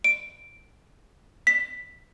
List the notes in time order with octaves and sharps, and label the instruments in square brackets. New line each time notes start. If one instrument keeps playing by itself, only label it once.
[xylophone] D7
B6